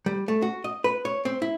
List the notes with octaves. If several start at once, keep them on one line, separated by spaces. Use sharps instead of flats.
G3
A3
F#4
D#5
B4
C#5
C4
E4